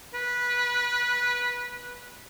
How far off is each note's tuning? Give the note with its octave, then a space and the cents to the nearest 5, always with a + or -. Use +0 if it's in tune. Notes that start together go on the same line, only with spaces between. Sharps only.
B4 -15